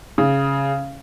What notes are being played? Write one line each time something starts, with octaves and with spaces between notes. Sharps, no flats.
C#3